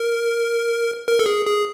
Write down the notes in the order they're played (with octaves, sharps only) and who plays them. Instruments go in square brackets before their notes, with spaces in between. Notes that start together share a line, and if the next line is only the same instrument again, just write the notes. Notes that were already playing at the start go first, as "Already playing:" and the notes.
Already playing: [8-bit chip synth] A#4
A#4
A4
G#4
G#4